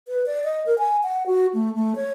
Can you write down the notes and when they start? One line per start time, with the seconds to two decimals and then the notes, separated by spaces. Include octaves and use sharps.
0.08 B4
0.26 D5
0.44 D#5
0.66 A#4
0.78 G#5
1.03 F#5
1.26 F#4
1.53 A3
1.74 A3
1.96 C#5